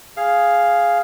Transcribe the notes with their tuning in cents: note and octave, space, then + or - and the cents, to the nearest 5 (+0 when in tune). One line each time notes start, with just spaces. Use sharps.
G#4 +0 F5 +0